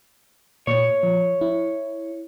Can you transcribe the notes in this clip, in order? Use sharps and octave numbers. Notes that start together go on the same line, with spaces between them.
A#2 C#5
F3
E4